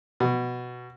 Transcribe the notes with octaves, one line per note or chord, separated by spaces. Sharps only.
B2